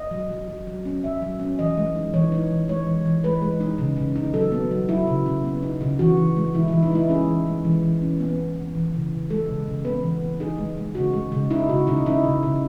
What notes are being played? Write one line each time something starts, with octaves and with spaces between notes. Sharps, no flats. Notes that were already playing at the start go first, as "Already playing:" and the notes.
Already playing: D#5
F#3
F#3
F#3
F#3
C#4
F#3 E5
F#3
C#4
E3 D#5
G#3
D#4
E3 C#5
D#4
E3
G#3 C#5
E3
E3
G#3 B4
G#3
D#4
C#3
C#3
D#4
F#3 A4
B3
F#3
F#3 E4
C#3
C#3
B3
D#4
C#3
E3 F#4
E3
G#3
E3 E4
E3 E4
D#4
G#3 E4
C#4 G#4
E3
G#3
E3
E3
C#4
B3
B3
B3
E3
C#3
C#3
G#3 A4
C#3
C#3
B3 B4
E3
B3
D#4 G#4
G#3
G#3
C#3 F#4
G#3
C#3
D#4 E4
C#3 F#4
C#3 D#4
D#4 E4
C#3
C#3